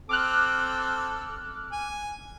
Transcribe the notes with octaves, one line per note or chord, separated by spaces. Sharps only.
C4 A4 D6 F6 F#6
G#5